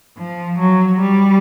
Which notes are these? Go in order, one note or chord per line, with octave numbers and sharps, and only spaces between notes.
F3
F#3
G3